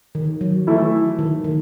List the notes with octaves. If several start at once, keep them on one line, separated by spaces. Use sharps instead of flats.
D#3
F#3
E3 A3 E4
D#3
D#3